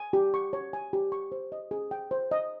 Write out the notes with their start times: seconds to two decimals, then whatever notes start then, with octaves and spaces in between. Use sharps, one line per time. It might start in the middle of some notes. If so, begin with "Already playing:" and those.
Already playing: G#5
0.13 G4
0.34 C#6
0.53 C#5
0.73 G#5
0.93 G4
1.12 C#6
1.32 C5
1.52 D#5
1.71 G#4
1.91 G5
2.11 C5
2.31 D#5